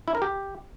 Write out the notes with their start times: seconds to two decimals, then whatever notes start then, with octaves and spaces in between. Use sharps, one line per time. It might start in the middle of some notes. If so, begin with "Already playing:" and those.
0.08 E4
0.15 A#4
0.22 G4